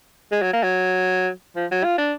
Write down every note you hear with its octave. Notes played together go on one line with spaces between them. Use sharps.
G#3
F#3
A#3
F#3
F3
F#3
F4
D4